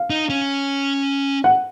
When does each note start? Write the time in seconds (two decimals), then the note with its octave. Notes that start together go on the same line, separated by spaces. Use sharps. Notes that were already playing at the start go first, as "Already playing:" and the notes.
Already playing: F5
0.10 D#4
0.30 C#4
1.44 F#5